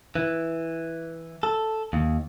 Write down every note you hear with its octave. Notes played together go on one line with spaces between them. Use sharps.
E3
A4
D#2